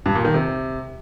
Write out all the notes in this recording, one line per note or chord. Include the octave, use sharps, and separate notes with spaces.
G2
A#2
D#3
C3